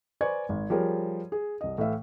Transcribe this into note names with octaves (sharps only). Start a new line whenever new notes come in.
B4 C5 D5 G#5 C#6 G#6
G#1
F3 G3 G#4 A#4 C#5
G#4
C2 D#5
A2 E3 E5 F5